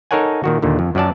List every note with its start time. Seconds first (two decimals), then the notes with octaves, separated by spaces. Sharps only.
0.11 D#4 A4 A#4 C#5 F#5 G#5
0.44 A#2 D#3 F#4
0.62 D#2 A#2 D3
0.79 F2
0.95 F#2 F#3 D5 A5